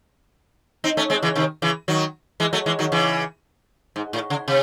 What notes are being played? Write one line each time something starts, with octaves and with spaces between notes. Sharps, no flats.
C4 D#4
A3 C#4
G#3 C4
C#3 E3
C3 D#3
C#3 E3
D#3 F#3
E3 G#3
F#3 A3
E3 G#3
D#3 F#3
C#3 E3
G#2
A2
C#3
C3